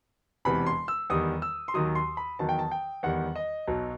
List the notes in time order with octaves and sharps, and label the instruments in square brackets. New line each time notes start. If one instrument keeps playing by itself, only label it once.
[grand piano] E1 E2 C3 E3 B5
C6
E6
E2 D#3 G3 D#6
E6
C6
D#2 D#3 F#3 D#6
C6
B5
E2 D#3 F#3 A5
G5
A5
G5
E2 D#3 G3 F#5
D#5
B1 B2 F#3